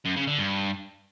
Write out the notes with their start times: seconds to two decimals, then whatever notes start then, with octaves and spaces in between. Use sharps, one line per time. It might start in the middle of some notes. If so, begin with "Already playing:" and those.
0.05 F#2
0.16 C#3
0.27 D3
0.38 G2